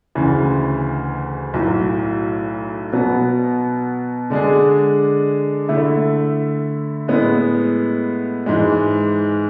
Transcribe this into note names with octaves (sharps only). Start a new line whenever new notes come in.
D2 C#3 E3
B1 A2 F#3
B2 F#3 B3
D3 G#3 D4 G#4
D3 A3 E4
A2 G#3 B3
G#2 E3 G#3